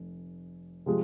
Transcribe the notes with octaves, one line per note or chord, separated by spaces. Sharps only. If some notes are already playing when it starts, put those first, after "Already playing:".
Already playing: F1
C3 F3 G#3